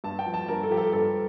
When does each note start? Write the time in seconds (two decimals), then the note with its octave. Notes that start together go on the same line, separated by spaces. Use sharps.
0.04 G2 A5
0.19 G5
0.26 F3
0.34 A5
0.48 G2 A#4
0.63 A4
0.70 F3 G4
0.77 A4
0.92 G2 A4